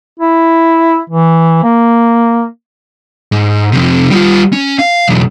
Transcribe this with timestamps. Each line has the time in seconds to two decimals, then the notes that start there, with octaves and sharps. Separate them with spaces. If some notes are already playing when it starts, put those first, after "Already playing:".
0.19 E4
1.10 E3
1.63 A#3
3.32 G#2
3.72 F2 C3
4.10 G3 F4
4.52 C#4
4.79 F5
5.08 B1 E2